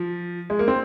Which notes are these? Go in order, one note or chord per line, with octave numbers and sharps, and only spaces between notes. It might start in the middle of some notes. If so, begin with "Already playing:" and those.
Already playing: F3
G#3
A#3
C4